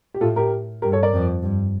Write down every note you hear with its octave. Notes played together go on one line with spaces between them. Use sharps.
G4
A2 F4 A4
G4 A#4
G2 G4 A#4
A4 C#5
A#4 D5
F2
G2